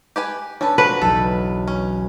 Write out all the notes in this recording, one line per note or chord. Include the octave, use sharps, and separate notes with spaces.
G4 B4 G#5
C#4 D4 A4 B4
F3 F#3 F#4 B4
B1 E2 A4
C#4